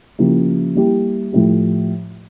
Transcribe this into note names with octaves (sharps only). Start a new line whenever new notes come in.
C#3 F3 A#3 E4 G4
G3 A#3 E4 G4
A2 F3 A3 E4 G4